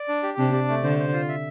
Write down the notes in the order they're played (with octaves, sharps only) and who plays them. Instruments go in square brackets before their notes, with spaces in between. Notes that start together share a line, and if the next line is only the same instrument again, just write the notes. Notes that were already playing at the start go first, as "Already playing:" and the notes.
Already playing: [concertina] D5
D4
G4
[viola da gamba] C3 [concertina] D4
[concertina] D5
A3
[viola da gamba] D3 [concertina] C5
[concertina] C5
F4
E5